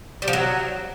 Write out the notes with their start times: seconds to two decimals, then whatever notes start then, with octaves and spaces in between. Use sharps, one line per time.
0.22 G3
0.28 F3
0.33 F#3